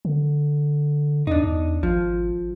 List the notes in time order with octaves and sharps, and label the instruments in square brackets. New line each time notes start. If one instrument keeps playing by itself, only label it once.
[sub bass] D3
[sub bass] E2 [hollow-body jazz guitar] D4 D#4
[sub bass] E2
[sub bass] G#1 [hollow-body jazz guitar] F3